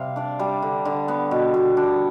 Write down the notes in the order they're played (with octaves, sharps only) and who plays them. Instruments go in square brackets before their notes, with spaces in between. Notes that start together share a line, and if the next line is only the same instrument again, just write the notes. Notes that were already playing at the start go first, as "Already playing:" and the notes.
Already playing: [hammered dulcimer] C3 G3 F5
D4 D5
G3
D3
D3
B3
B2
B2
D4